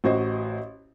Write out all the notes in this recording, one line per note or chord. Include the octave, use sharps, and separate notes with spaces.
A1 F#4 C5 D#5